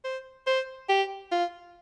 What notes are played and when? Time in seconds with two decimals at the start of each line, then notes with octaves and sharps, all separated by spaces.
0.04 C5
0.47 C5
0.89 G4
1.32 F4